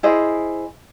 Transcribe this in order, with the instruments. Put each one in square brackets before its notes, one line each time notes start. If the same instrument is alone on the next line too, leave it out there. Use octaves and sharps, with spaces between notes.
[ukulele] E4 G#4 C5 D#5